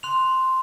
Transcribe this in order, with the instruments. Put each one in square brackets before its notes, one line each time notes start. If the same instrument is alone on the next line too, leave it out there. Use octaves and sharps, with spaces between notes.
[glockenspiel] C6 F#6 F7